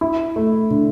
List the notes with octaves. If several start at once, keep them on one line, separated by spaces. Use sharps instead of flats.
E4
A3
D3